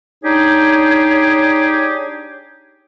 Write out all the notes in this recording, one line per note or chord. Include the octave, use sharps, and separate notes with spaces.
D4 D#4 G4 G#4 C#5